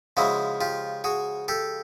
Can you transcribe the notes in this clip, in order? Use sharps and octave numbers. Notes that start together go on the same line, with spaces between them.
C#3 F3 G#3 E4 F#4
F4 G4
F#4 G#4
G4 A4